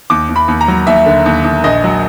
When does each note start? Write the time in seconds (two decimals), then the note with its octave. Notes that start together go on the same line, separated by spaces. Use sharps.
0.10 D#2 D6
0.29 D#2
0.36 B5
0.48 D#2
0.61 A#5
0.68 F#3
0.87 D#2 E5
1.06 D3
1.26 D#2
1.44 D#2
1.64 A#1 D#5
1.84 F#3